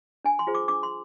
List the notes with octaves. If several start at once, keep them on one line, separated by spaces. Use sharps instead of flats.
D4 G#5
C6
F4 G#4 C5
D6
D4 D6
C6